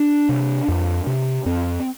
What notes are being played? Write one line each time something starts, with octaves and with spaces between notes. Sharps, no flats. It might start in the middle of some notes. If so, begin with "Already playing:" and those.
Already playing: D4
C3
F2
C3
F2 C4